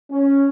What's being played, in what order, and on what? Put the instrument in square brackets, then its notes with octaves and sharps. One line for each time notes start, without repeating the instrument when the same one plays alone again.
[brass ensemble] C#4